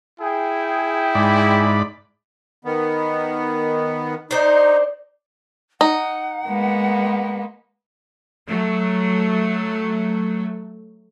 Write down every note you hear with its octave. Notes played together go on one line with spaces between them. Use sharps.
E4 G#4 G5
G#2 D5 B5
D#3 B3
D4 D#4 C5 D5
D#4 F#5
G#3 A#3 B3
F#3 A3